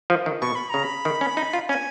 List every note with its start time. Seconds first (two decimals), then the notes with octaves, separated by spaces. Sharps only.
0.10 F3
0.26 D#3
0.41 B2 C#6
0.55 B5
0.70 C#3 A#5
0.83 B5
1.05 D#3
1.21 C#4
1.37 D#4
1.53 F4
1.69 C#4 G#5